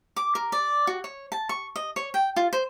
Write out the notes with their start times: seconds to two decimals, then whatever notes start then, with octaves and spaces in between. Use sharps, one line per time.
0.16 D6
0.35 A#4
0.52 D5
0.87 F#4
1.04 C#5
1.32 A5
1.49 C#6
1.76 D#5
1.96 C#5
2.14 G5
2.36 F4
2.53 C5